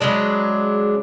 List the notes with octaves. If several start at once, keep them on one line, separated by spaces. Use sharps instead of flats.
C#3 F#3 G#3 D4